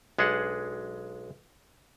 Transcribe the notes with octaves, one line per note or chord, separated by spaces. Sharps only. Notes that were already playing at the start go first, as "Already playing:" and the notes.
B1 G#3 D4 G#4 F#5